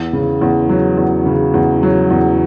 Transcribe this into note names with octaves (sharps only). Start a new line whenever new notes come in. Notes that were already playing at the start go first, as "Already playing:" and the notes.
Already playing: E2
C#3
E2
F#3
E2
C#3
E2
F#3
E2